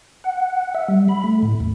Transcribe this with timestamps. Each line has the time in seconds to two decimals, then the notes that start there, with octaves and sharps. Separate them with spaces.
0.24 F#5
0.75 E5
0.88 G3
1.08 B5
1.24 A3
1.43 A2
1.60 E2